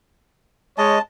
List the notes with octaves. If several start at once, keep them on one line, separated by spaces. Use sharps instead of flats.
G#3 C#5 D#5 A5